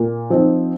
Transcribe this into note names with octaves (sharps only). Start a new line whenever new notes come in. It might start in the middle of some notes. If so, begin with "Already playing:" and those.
Already playing: A#2
F3 C4 D#4